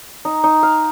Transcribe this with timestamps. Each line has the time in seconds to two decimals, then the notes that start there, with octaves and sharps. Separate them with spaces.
0.25 D#4
0.44 D#4
0.63 F5